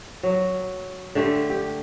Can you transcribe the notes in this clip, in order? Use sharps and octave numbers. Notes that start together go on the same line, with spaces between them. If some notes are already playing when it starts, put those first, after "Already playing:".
F#3
D3 A3 G4
G4